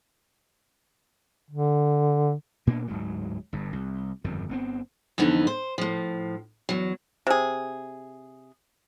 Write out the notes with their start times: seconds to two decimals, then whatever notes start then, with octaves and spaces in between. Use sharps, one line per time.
1.50 D3
2.67 A#2 A#3 B3 D4
2.88 D1 G#2 F#3
3.53 G1 G2
3.73 C2
4.24 G1 F2 G#2 D#3
4.49 G1 B3 C4
5.18 F2 D3 E3 B3 D#4
5.47 C5
5.78 A2 F3
6.69 E2 F#3
7.27 C3 G#4